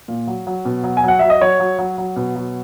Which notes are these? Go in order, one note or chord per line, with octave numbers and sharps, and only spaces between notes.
A#2
F#3
F#3
B2
F#3
G#5
F#3 F#5
F#3 E5
D#5
F#3 C#5
F#3
F#3
F#3
B2
F#3